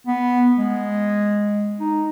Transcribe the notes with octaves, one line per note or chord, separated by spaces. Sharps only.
B3
G#3
D#4